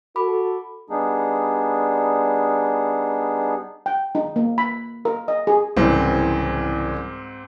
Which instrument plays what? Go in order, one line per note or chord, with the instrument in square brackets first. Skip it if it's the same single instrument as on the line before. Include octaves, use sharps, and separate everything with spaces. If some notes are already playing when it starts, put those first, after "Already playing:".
[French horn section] F#4 A4 [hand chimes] B5 D6
[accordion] G3 B3 D4 D#4 G#4
[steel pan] G5
D#4
A#3
B5
A#4
D#5
G#4
[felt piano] C2 C#3 E3 [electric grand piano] G#2 C4